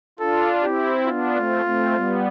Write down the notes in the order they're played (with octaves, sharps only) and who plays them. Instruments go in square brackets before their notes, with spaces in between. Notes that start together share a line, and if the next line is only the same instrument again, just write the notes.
[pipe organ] D4 F4 [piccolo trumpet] A4
[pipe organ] C4 E4 [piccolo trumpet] G4
[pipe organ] B3 D4 [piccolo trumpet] F4
[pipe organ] A3 C4
A3 C4
G3 B3